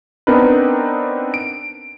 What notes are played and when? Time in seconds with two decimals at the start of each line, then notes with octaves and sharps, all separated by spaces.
0.27 B3 C4 D4 D#4 A#4 B4
1.34 D7